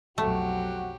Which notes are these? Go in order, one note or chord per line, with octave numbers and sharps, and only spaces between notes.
B1 F2 F#3 A3 F#4 G4 F#5